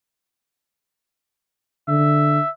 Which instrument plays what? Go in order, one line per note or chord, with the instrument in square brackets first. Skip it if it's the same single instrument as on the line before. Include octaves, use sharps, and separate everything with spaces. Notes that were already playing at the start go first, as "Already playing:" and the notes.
[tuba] D3 [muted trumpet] E5